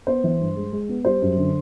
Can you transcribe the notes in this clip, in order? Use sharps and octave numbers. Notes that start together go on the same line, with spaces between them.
B3 C5
E3
G2
G#3
G#3
B3
G3 C5
F#2
D3